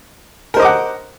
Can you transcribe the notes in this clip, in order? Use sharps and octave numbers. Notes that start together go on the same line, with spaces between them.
A#4 C5 D#5 F#5 D6